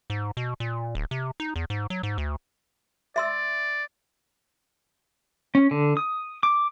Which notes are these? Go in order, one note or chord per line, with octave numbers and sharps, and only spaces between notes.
G#2
B2
A#2
D1
C3
D#4
E2
G#2
F#3
G#2
D2
D5 E5 C6 E6
C#4
D3
D#6
D6